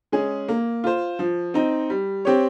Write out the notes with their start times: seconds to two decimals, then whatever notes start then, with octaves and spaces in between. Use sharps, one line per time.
0.12 G#3 C#4 G#4
0.49 A#3
0.84 F4 C5
1.19 F3
1.54 C4 D#4
1.90 G3
2.25 C4 G4 C#5